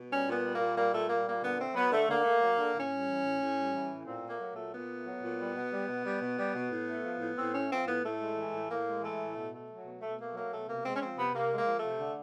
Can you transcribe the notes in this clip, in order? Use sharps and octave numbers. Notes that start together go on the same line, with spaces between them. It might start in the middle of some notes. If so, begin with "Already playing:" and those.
Already playing: B2
G3 C#4
A#2
B3
G3
A#3
A#2
G3 A#3
A#2 A3
G3 A#3
A#2 A#3
D3 B3
A3 C4
F#3 B3
D3 A3
D3 A#3
A3
F#3
D3
A2 C#4
G3
E3
A2
A2
G3
E3
A2
A#2 C4
A3 A#3
F#3
A#2 A3
A#2 B3
A3
F#3
A#2
G3
B2
G3
B2
G3
B2
G3
B2
A2
A3
F3
A2
A2 C4
A3 C#4
F3 C4
A2 B3
A2 A3
G#3
E3
A2
A2 A#3
G#3
E3 A3
A2
B2
A3
F#3
B2
B2 A3
A3 A#3
F#3 A#3
B2 A3
C3 A#3
G#3 C4
C#4
F3 C4
C3 B3
C3 A#3
G#3
A#3
F3
A3
C3
D3